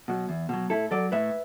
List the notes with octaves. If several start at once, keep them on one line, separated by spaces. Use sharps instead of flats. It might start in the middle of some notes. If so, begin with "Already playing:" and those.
B2 F#3
E2
B2 F#3
A2 E4 A4
F#3 A4 D5
A2 B4 E5